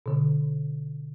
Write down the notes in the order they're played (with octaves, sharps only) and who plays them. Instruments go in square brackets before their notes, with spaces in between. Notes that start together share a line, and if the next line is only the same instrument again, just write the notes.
[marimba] B2 D3